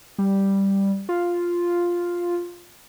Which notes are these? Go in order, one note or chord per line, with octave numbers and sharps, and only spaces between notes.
G3
F4